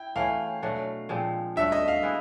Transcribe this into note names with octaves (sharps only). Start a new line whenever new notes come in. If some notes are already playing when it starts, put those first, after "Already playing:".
Already playing: E4 G5
E3 A3 C#4 F5
B2 F#3 A3 D4
A#2 F3 G#3 C4
G2 D3 F#3 A3 E5
D#5
F5
G#3 B3 E4